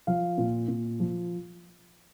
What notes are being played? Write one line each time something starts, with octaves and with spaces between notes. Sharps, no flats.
F3 F5
A#2
A#2
F3